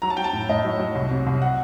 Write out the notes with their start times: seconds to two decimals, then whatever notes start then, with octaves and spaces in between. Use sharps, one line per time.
0.02 F#3 A#5
0.10 A5
0.17 F#3 G5
0.24 A5
0.33 A2
0.49 A2 D#5
0.65 F#3
0.80 F#3
0.95 C2
1.11 C3
1.27 C2
1.42 F#5